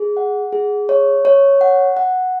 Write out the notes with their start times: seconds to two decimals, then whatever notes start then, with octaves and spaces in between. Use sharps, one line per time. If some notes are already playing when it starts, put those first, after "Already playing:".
Already playing: G#4
0.17 F#5
0.53 G#4
0.89 C#5
1.25 C#5
1.61 F#5
1.97 F#5